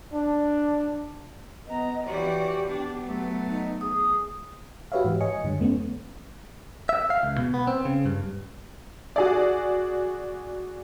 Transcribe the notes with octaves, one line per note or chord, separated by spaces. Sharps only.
D4
B3 D#5 A#5
E3 F#4 G4 C#5 D5
B3 D4
F#3 A3
D#4
G#4 D#6
F#4 G4 B4 C#5 E5 F5
G#2 E3
C#5 D#5 G#5 C#7
G2 D3 G3
F2 A3 B3 C#4
E5
F5
C#2
B2
B3
C4
C#3
G2
F#4 G#4 D5